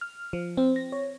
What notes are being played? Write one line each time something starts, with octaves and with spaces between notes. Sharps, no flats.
F6
F3
C4
A#6
C#5